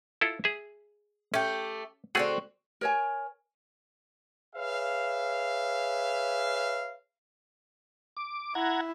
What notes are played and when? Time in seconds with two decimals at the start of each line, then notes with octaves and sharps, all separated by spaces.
0.21 E4 F4 A4
0.44 G#4 E5
1.34 A3 C#4 G4
2.15 D3 A3 C4 F#4 G#4 F#5
2.81 A#4 C#5 G#5
4.56 G#4 B4 C#5 E5 F5
8.17 D6
8.55 E4 F#5 A#5 G#6